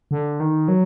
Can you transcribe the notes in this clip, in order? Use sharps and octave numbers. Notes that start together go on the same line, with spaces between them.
D3
D#3
F#3